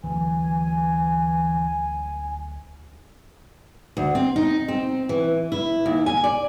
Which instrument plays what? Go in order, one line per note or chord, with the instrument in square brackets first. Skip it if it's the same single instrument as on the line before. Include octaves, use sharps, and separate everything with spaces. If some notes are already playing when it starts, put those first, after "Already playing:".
[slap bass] D2 F#3 [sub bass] E3 [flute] G#5
[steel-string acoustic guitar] D2
C4
D#4
C4
E3
E4
D#2
G#5
D5